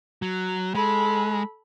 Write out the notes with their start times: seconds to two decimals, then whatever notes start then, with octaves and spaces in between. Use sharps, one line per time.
0.22 F#3
0.75 G#3 A4 B5